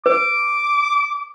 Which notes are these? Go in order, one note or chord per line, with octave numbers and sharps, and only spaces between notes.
B4 D6